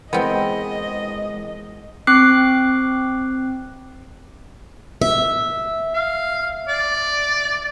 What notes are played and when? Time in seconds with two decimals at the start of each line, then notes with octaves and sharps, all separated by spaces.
0.13 E3 G#3 B3 C4 A#4 D#5
2.07 C4 D6 F#6 C7
5.01 E5
5.94 F5
6.69 D5